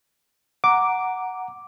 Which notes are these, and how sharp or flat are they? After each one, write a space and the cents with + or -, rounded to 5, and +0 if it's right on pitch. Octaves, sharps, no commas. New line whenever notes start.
F#5 +0 A#5 +0 D6 +0